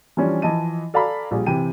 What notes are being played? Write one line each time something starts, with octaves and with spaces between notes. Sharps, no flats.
E3 F3 G3 C#4 D4
E3 F3 D#5 A5 D#7
A4 D5 F5 G#5 A#5 B5
A#1 G3 G#4
C3 E3 G5 D#7